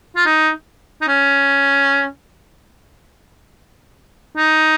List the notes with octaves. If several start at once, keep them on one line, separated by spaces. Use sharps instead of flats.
F4
D#4
D#4
C#4
D#4